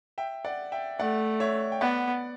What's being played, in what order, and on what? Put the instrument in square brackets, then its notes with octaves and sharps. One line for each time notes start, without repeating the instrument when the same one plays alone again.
[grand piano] E5 G5
D5 F#5
E5 G5
[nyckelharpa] A3 [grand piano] D5 F#5
[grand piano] C#5 E5
G5
[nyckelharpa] B3 [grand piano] D5 F#5